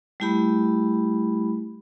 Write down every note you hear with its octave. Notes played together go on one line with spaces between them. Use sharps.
G3 A3 E4 G4 B5